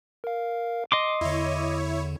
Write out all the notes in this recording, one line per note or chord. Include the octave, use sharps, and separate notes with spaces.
A#4 F5
D#5 C6 D6
E2 D3 E4 C#5